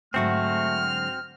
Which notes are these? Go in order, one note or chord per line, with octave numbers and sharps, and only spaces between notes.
G#2 D3 F#3 A3 C4 F#4 F6